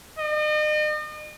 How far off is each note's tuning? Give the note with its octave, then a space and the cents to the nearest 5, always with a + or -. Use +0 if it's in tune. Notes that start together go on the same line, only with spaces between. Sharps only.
D#5 -40